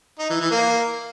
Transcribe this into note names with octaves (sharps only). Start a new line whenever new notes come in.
D#4
E3
E3
A#3